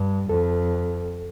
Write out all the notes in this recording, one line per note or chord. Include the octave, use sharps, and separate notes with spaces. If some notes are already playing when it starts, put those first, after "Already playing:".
Already playing: G2
F2 A4